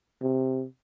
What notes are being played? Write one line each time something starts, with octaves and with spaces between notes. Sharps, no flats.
C3